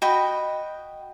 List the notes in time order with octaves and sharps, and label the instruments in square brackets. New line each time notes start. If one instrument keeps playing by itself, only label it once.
[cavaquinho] F#4 D#5 G5 B5